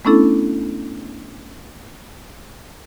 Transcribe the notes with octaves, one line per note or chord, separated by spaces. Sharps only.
A3 B3 C#4 D4 E4 A4